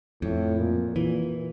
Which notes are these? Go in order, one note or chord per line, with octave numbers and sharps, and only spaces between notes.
F2 A2
A#2
A#2 E3